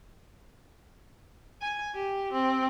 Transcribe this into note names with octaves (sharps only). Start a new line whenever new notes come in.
G#5
G4
C4